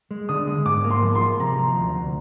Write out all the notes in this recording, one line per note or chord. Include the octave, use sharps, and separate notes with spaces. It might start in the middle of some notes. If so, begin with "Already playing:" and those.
G#3
D3 D#6
G#3
G#2 D6
A#3
C6
F3
C6
F3
C3 A#5
F3
D2
D2